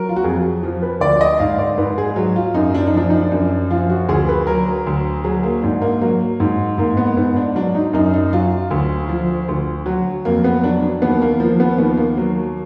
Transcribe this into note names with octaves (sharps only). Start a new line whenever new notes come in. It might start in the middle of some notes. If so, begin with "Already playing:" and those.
Already playing: F#3 A#4
F4
F#4
F2 G#4
F3
B4
D2 D5
D#5
G#2 F5
D5
G#2 B4
G#4
F#3
F4
F#2 D#4
D4
D#4
F3 D4
D#4
D4
F#2
F3 F4
F#4
D2 G#4
B4
F#3 A#4
D2
F#3 G#4
A#3
G#2 D4
A#3
F#3 A#3
G#2
G#2 A#3
B3
G#2 B3
D4
F#3 D4
D#4
F#2 D#4
D#4
F#3 F4
D2
F3
D2
F#3 F#4
F2 A#3
B3
F#3 D4
D4
D#2 B3
A#3
F3 A#3
B3
D#2 B3
A#3
F#3